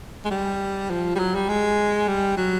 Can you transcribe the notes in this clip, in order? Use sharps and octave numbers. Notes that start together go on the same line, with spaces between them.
G#3
G3
F3
G3
F#3
G3
G#3
G3
F#3